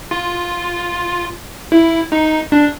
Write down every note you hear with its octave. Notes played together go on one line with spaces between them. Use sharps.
F4
E4
D#4
D4